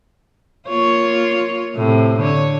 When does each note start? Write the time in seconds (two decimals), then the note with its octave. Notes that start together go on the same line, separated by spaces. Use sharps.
0.69 A#3 F4 C#5
1.76 A2 C3
2.18 D3 C#5